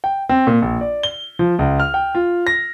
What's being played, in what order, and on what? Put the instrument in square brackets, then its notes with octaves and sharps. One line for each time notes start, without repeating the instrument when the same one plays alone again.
[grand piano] G5
C4
A#2
A#1
D5
G7
F3
C#2
F6
G5
F4
A#6